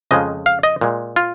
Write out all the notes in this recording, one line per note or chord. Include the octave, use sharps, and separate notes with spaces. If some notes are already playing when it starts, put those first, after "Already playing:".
F2 C#3 F3 G#3 D#5
F5
D#5
A#2 G#3
F4